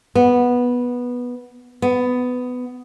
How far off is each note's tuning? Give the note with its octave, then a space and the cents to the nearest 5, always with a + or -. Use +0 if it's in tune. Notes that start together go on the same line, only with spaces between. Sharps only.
B3 -10
B3 +15